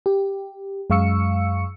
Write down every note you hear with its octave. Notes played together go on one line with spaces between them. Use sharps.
G4
F#2 G#3 F5 C#6 E6 C#7